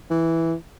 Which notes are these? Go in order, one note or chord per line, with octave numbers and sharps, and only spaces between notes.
E3